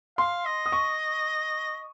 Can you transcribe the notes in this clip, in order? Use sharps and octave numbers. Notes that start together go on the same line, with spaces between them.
F5 C6
D#5
D#6
C#6